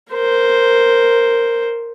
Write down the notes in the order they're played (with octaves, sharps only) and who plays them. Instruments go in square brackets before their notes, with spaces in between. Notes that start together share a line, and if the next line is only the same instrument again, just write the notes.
[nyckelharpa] A#4 C5